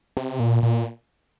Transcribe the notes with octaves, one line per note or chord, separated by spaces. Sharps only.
C3
A#2
A#2